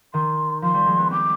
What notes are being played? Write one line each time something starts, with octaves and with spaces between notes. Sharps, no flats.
D#3 C6
F3 C6
G3
G#3
B3
C4 D6